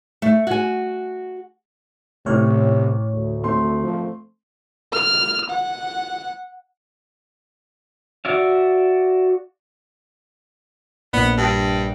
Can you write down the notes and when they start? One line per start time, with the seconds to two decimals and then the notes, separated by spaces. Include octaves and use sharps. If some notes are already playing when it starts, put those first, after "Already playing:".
0.22 A3
0.47 F#4 G#5
2.26 A1 A2 C3 C#5 F6
3.13 D2
3.43 A3 C4 C6
3.83 F3
4.93 F6
5.49 F#5
8.25 F#4 D5 E5 F5
11.13 A#1 B3
11.37 G2